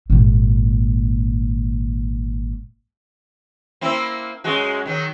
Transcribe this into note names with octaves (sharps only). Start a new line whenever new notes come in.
G#1 A#2
A#3 C4 E4
F#2 G#3 F#4
D#3 F#3